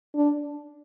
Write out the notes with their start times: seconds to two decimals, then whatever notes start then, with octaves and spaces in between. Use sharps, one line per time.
0.15 D4